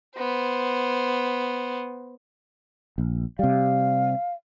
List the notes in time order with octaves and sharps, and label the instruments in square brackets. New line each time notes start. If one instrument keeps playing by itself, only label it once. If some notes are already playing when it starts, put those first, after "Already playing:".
[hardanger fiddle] B3 C5
[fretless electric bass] A#1
[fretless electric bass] C3 G3 [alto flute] F5